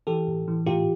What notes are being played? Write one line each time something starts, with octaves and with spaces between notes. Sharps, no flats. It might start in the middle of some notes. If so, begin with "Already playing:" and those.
E3 G4 A4
A2
E3
A2 F4 G4